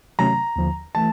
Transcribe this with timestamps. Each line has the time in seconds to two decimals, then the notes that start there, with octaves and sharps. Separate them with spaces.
0.19 C3 D#3 F#3 A3 C#4 A#5
0.56 D#2 D3 F3
0.95 E3 A3 A5